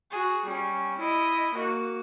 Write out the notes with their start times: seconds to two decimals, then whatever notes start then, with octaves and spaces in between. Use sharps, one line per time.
0.11 F#4 G#4
0.45 G3 C#4
0.98 E4 D#5
1.54 A#3 F#4